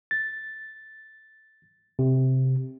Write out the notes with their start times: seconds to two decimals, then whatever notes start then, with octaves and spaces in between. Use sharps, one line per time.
0.11 A6
1.99 C3